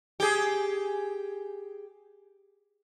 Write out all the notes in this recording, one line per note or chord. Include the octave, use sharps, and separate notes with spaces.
G4 G#4